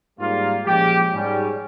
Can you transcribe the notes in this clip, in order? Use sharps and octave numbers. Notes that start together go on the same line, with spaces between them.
G#2 G3 A#3 F4
A#2 F3 G#3 C#4 G4
G#2 G3 C#4